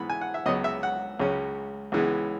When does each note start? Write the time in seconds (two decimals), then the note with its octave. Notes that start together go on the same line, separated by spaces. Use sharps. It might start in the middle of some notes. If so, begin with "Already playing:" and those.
Already playing: G#2 E3 B3 B5
0.10 G#5
0.21 F#5
0.34 E5
0.46 C#2 C#3 F#3 B3 D#5
0.64 E5
0.83 F#5
1.20 C#2 C#3 F#3 C#4
1.92 C#2 C#3 E3 G#3 B3